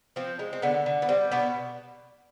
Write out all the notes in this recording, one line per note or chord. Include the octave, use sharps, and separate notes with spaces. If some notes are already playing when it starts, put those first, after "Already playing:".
F3 C4
G#3
C4
D3 B3
D3
B3
G3 C4
B2 B3 D4